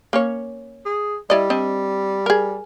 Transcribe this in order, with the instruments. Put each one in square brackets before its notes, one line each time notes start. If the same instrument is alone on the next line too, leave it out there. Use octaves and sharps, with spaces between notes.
[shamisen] A#3 C#4 C#5
[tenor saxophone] G#4
[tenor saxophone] G3 [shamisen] E4 D5 D#5
[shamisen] C4 D4 D#5
G#4 A#4